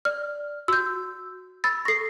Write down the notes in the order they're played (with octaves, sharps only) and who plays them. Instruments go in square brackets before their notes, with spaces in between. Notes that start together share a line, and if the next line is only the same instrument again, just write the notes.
[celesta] D5 [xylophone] F6
[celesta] F#4 [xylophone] E6 G6
[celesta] B5 E6 [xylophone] A6
[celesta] A4 C#6 [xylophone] A#6 C7